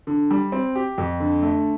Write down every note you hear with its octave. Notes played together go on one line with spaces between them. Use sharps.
D3
G3
C4
G4
F2
D3
A3